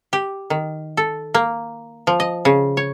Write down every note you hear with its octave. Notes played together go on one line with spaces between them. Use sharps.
G4
D#3
A4
A#3
F3
D#5
C#3
C#5